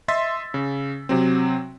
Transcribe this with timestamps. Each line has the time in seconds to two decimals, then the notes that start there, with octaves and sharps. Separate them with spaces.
0.08 D#5 E5 C6 E6 A6 B6
0.54 C#3
1.09 C3 F#3 C4